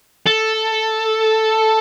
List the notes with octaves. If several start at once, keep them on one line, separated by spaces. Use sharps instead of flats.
A4